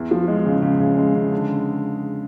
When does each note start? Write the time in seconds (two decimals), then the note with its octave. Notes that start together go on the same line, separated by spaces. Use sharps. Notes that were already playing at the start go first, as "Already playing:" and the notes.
Already playing: E2
0.11 F3
0.28 G#3
0.46 C#3
0.62 C#3
0.80 C#3
0.98 G#3
1.15 C#3
1.32 D3